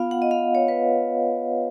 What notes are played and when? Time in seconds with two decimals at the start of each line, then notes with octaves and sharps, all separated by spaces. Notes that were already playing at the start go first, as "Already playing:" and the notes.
Already playing: B3 F4 F5
0.11 F#5
0.22 D#5
0.31 F5
0.55 C#5
0.68 B4